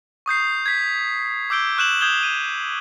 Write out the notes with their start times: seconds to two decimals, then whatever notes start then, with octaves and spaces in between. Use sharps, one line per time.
0.26 C#6 D#6 G6 C7
0.66 G#6 B6
1.50 D6 E6 G6 D7 G7
1.77 C#6 F#6 E7 F#7
2.01 D#6 G6 G#6 E7 F7 G7
2.23 D#7